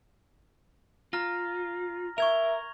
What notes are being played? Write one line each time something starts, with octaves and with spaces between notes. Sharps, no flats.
F4 A#5 F6 A#6
A#4 E5 C#6 G#6 F7